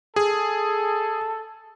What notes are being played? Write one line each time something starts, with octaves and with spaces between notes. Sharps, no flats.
G#4 A4